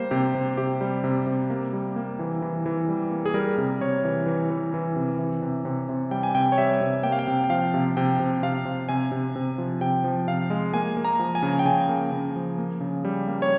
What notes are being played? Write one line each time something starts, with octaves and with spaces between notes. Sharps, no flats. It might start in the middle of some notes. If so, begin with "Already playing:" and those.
Already playing: G3 A#3 C5
C3 G4
C3
C3 G4
G3
C3
C3
A#3
G3
A#3
E3
E3
E3
G3
A#3
G#4
G3 A#4
C3
C3 C#5
E3
E3
E3
E3
C3
E3
C3
C3
C3
G3 G5
G#5
C3 G5
C#5
G3 E5
C3
A#3 G5
F5
G5
C3
G5
F3 F5
C3
C3 G5
C3
C3 F5
C3
C3 G#5
C3
C3
F3
C3 G5
F3
C3 F5
G#3
A#3 G#5
A#3
A#5
F3
G#5
C#3
G5
C#3 G#5
A#3
C#3
F3
A#3
C#3
G3
A#3
C#5